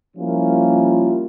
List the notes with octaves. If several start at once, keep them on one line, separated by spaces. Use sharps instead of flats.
F3 G3 A#3 C#4 E4 F4